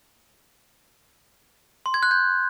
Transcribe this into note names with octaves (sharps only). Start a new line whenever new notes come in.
C6
G#6
F#6
G6